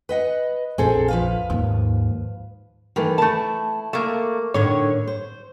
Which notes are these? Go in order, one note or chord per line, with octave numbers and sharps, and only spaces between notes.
B4 D#5 F#5
A#1 F2 C4 G#4 A4
F3 B4 F5
D#2 G#2
D#3 E3 A3
A3 E4 A5
A3 A#3
A2 D3 D#3 C#5
C5